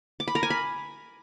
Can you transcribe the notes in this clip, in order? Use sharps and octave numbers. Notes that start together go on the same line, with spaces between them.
D6
B5
A#4
G#5
B5